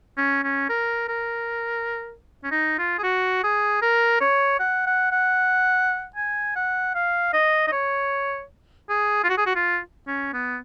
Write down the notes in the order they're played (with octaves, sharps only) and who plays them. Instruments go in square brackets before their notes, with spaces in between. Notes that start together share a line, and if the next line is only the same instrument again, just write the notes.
[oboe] C#4
C#4
A#4
A#4
C#4
D#4
F4
G#4
F#4
G#4
A#4
C#5
F#5
F#5
F#5
G#5
F#5
F5
D#5
D#5
C#5
G#4
F4
F#4
G#4
F#4
F4
C#4
B3